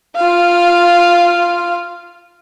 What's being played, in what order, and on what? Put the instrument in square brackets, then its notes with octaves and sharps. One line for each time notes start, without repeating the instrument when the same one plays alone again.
[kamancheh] F4 F5